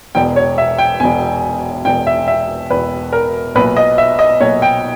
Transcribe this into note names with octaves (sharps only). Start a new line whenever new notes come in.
E1 E2 B2 G5
C#5
E5
G5
E1 E2 B2 G#5
E1 E2 B2 G5
E5
E5
E1 E2 B2 B4
A#4
B1 A#2 B4
D#5
E5
D#5
B1 A#2 C#5
G5